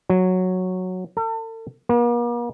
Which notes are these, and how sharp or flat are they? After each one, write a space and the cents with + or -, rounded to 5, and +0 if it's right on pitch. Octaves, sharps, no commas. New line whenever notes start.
F#3 -5
A4 +40
A#3 +45